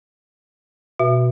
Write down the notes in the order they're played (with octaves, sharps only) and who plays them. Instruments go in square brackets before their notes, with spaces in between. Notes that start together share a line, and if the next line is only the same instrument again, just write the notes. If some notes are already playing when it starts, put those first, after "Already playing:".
[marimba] B2 [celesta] F#4 E5